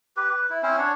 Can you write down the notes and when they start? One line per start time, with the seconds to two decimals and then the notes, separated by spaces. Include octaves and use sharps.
0.17 G4 B4
0.30 B4
0.50 E4
0.63 C4 C#4 E4 C5
0.78 D4 C#5 F#5